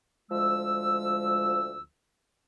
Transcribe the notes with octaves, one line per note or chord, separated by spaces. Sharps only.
D2 F3 G#3 E6